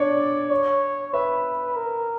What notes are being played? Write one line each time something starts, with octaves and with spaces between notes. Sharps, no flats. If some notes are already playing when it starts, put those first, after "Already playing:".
Already playing: D4 C#5 D5
C#5
B4 E5
A#4